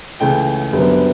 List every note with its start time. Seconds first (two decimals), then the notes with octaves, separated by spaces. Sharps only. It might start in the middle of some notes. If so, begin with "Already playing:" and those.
0.20 C#2 C#3 E3 A3 G5
0.72 F#1 F#2 D3 G3 B3